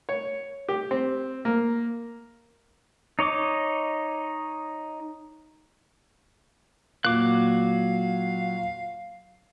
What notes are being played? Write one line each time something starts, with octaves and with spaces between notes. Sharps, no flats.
C#5
G4
C4
A#3
D#4 C#5 D#5 D6
A#2 F#3 F5 D6 F#6